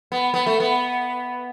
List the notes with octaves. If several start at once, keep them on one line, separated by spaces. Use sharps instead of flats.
B3
B3
A3
B3